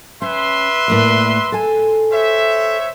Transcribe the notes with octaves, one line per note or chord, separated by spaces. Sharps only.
C#4 B4 E5 C6
A2 A#3 D5
A4 G#5
C5 C#5 E5